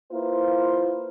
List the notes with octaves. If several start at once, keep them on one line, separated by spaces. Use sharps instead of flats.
A#3 E4 F4 B4 C5